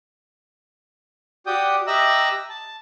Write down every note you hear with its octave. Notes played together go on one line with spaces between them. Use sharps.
F#4 G4 D5 G5 D#6 G6
G4 D#5 E5 A#5 E6 F#6
A5